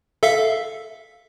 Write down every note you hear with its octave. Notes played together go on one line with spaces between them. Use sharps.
A4 E5 F5